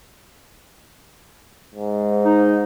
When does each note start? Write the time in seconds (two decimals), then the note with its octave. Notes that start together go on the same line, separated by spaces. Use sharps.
1.75 G#2
2.24 D#4